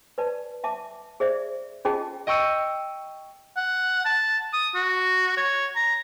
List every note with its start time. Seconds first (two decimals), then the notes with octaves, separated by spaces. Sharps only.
0.18 B4 D5 A5
0.64 E5 A5 D6
1.20 G#4 C5 D5 E5
1.85 C#4 F4 G#4 D#5 G5 A5
2.27 D#5 G5 C#6 E6 C#7 D#7
3.57 F#5
4.05 A5
4.53 D#6
4.75 F#4
5.37 C#5
5.76 A#5